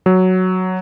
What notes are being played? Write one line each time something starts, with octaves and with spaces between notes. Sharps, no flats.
F#3